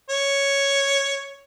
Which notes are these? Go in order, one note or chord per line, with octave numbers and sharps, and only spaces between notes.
C#5